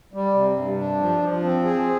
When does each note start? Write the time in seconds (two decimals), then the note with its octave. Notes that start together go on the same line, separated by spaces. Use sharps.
0.14 G3
0.34 C3
0.57 G2
0.77 D4
1.00 F3
1.22 F3
1.43 C4
1.65 G#4